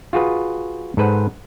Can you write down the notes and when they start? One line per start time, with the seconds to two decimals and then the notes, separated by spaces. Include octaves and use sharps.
0.13 F4 F#4 G#4 B4
0.97 G#2 A4 B4 C5 F#5